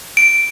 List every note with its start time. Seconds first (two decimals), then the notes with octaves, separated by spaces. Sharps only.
0.17 D7